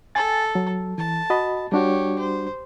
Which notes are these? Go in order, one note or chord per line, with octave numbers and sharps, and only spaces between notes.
A4 G#5 A6
F#3
E3 A5
F#4 D#5 B5
G3 D4 F#4 G4 C#5
C5